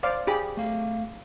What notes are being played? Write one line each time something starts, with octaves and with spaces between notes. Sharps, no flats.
C5 D5 F5
G4 G#4 B5
A3 F5